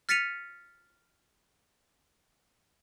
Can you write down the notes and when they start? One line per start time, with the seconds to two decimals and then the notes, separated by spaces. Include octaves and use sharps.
0.09 F6 A6 B6 C#7 D#7 F7